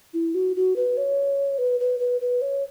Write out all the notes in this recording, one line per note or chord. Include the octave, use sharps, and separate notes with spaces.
E4
F#4
F#4
B4
C#5
B4
B4
B4
B4
C#5